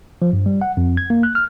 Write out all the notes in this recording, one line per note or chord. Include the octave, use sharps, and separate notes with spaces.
F3
G2
G3
F#5
F2
G#6
A#3
F#6
F6